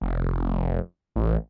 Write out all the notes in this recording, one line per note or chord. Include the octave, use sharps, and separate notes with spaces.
F1
A1